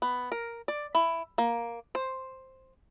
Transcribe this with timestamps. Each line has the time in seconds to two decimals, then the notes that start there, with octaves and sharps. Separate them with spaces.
0.02 B3
0.32 A#4
0.68 D5
0.95 E4
1.38 A#3
1.95 C5